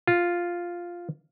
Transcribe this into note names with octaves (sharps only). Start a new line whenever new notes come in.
F4